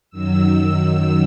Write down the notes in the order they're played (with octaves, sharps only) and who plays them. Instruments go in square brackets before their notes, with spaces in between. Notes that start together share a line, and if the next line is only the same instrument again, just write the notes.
[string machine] F#2 D#3 F#3 E6